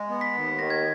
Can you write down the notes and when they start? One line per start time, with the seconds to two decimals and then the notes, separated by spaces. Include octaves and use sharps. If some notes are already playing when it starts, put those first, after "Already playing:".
Already playing: G#3
0.09 B3
0.21 B6
0.34 D#2
0.59 D#3 A#6
0.70 G#6